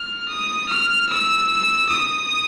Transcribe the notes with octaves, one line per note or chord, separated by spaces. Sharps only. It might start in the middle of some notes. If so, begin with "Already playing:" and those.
Already playing: F6
D#6
F6
E6
D#6